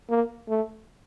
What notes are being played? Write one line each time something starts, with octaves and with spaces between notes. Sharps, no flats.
A#3
A3